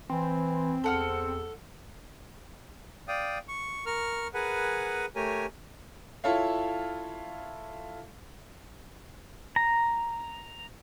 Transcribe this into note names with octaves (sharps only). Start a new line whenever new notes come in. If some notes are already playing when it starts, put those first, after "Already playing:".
E3 C4
E2 A4 F#5 F6
D5 F5 G5 D#6
C#6
A#4 C#6 F6
G#4 A#4 B4 F#5 G#5 B5
A3 G4 A#4 C#5 G#5
E4 F4 A4 C#5 F5
A#5